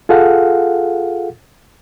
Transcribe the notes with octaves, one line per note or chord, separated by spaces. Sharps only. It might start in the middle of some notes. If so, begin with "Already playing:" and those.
F4 G#4 A4 F5 F#5